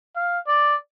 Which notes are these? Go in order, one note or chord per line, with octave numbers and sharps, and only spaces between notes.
F5
D5